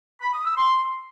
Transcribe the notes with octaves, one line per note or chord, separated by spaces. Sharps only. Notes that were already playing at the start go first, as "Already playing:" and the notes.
B5
D#6
E6
C6